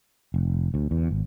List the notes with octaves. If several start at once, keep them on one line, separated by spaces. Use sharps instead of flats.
F1
D2
E2
G#1